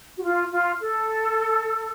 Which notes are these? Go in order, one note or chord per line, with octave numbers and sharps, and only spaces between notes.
F#4
F4
F4
A4